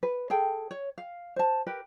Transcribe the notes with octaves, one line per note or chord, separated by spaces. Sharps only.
B4
G#4 A4 G5
C#5
F5
C5 A5
G4 A#4 B4